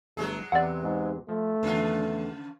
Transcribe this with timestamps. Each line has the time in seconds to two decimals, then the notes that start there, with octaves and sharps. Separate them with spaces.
0.17 G1 F#3 G#3 A3 G#4 A#5
0.52 E2 C3 C4 D5 F#5
0.83 G#2
1.29 F3 A3
1.63 E2 C#3 F4